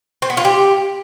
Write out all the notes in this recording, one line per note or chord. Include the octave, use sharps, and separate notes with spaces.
C4
B3
F4
G4